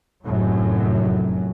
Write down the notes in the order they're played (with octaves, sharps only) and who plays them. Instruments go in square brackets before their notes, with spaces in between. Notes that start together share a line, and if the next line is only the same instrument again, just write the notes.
[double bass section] F1 F#2 A2 F#3